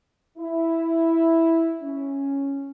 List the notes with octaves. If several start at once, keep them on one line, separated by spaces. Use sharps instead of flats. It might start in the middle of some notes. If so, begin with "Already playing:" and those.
E4
C#4